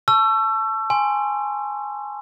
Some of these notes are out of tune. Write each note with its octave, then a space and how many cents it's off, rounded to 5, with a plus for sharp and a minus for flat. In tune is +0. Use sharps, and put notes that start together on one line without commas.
A5 -15 C#6 +5 E6 +30
G#5 -5 C6 +0